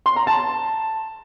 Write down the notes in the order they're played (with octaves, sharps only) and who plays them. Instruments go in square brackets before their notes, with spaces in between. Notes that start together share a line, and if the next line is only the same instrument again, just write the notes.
[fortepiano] C6
A#5
A5